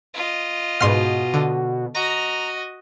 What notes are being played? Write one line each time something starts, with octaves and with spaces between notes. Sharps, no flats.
F4 D#5
G#2 B2 C6 F6
D3
F#4 D#5 A#5